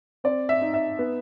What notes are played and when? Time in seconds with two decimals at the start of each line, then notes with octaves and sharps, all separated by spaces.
0.24 C4 D5
0.49 E5
0.62 D#4
0.74 E5
0.99 B3